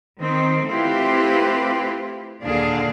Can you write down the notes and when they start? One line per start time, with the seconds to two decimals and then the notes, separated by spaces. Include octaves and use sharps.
0.21 D#3 C4
0.68 A3 C4 E4 F4 G4 B4
2.43 D#2 A#2 D3 D4 G#4 F5